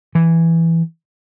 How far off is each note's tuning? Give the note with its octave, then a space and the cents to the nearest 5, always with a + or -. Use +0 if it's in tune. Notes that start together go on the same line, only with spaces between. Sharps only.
E3 +5